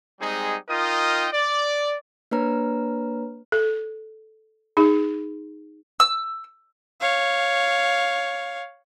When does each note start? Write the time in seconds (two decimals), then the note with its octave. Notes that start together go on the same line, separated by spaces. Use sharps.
0.20 G3 G#3 C4 D#4 G#4
0.69 D#4 F4 A#4 D#5 G5 D#6
1.33 D5
2.31 A#3 D4 B4 C#5 A#5 F6
3.52 A4
4.77 D#4 G#4
6.00 E6
7.00 C#5 F5